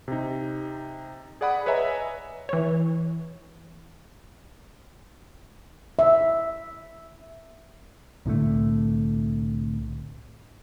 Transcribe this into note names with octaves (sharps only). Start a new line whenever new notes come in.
C3 D#4
G#4 D5 F#5 B5 D#6
B4 C#5 D#5 E5 G#5 A#5
E3 C#5
E5
C2 A2 D3 A3